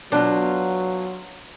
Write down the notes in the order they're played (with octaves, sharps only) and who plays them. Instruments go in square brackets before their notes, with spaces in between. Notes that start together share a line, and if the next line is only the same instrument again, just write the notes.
[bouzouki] B2 F4 [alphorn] F#3 [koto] D4